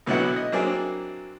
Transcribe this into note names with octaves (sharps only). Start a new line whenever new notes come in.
B1 D3 F#3 B3 E4 F#5
D#5
F#3 A#3 C4 D4 E4 G#4